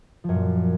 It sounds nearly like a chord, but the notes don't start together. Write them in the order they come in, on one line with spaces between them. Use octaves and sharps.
F3 F#2 A#2